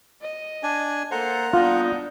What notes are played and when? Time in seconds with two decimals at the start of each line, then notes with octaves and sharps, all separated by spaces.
0.22 D#5
0.63 D4 G#5
1.12 A#3 A4 C5 F#5 A#5
1.53 G3 B3 D4 D#4 F4